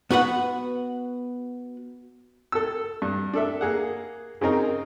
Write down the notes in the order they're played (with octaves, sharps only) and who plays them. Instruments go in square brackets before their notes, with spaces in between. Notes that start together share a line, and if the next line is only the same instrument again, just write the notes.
[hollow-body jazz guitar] B3 F#4 B4 F#5
[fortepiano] A4 E6
G2
D4 A4 E5
A#3 G#4 F#5
C#3 C4 D#4 A#4